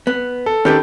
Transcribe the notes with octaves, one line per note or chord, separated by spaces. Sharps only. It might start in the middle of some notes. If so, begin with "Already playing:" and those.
B3
A4
D#3 C#4 G4 A4 B4 G6